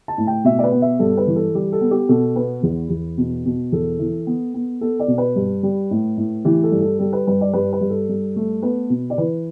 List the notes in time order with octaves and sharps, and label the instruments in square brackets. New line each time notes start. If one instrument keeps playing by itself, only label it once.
[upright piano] A5
A2
G5
B2 E5
D5
B4
B3
E5
G2 A4
B4
E3
A4
G3 G4
A4
B3
G4
B2 A4
B3 B4
E2
E2
B2
B2
E2 A4
E3
B3
B3
B3 A4
D5
B2
B4
G2
G3
A2
A2
E3 G4
A4
G2
A4
G3 A4
B4
G2 B4
D5
G2 B4
B4
G2
A4
G2
A3
B3 B4
B2
D5
E3 B4